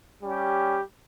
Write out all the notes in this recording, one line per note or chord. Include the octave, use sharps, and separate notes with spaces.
G3 C#4 G4